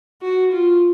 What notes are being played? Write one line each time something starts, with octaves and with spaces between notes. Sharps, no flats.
F#4
F4